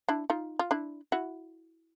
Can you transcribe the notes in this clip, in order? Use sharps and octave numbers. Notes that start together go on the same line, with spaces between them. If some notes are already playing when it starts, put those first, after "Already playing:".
D4 E4
D#4 F4
F4
D4 E4
E4 F#4